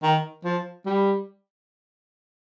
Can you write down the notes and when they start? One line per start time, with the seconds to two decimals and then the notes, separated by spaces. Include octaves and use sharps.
0.03 D#3
0.44 F3
0.86 G3